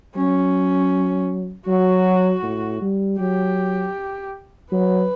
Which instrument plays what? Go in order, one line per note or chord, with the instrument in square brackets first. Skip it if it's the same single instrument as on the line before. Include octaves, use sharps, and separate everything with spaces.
[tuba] F#3 [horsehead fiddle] C#4
[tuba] F#3 [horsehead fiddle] F#4
[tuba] A2
G3
[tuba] F#3 [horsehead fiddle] G4
[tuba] F#3 [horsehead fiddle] B4